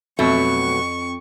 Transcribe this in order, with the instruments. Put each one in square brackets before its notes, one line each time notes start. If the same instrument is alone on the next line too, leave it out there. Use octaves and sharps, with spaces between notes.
[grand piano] F2 [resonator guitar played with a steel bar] B2 F#3 A3 [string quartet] C#6